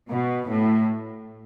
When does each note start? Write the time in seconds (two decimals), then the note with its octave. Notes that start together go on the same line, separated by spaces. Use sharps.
0.11 B2
0.49 A2